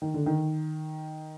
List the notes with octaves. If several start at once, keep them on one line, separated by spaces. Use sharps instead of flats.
D#3
D3
D#3